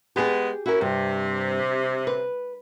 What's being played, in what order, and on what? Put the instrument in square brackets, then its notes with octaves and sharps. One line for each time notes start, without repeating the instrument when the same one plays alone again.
[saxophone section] G#3 B3 [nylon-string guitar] G4 G#4
[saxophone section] C#4 E4 [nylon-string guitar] F#4 A#4
[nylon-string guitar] G2 [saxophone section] C3
[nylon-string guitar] B4